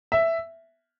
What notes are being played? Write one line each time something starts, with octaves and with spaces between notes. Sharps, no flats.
E5